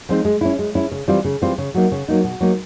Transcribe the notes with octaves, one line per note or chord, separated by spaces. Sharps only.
F3 G#3 C4 D#4
G#3
C#4 E4
G#3
C#4 E4
C#3
E3 G3 C4 F4
C#3
E3 G3 C4 F4
C#3
F#3 A#3 D#4
C#3
F#3 A#3 D#4
B2
F#3 A#3 D#4